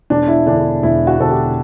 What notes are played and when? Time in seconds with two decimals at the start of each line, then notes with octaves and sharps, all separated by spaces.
0.10 E1 D4
0.28 E4
0.46 E2 D3 D4
0.83 E1 E4
1.07 F#4
1.19 E2 D3 A4
1.31 G4